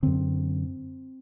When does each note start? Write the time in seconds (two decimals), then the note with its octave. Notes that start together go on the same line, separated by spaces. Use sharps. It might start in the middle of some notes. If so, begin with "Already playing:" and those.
0.03 F#2 D3 C4